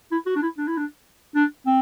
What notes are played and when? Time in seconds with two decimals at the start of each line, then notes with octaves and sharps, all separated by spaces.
0.12 E4
0.26 F#4
0.36 D4
0.43 E4
0.58 D4
0.68 E4
0.77 D4
1.35 D4
1.66 C4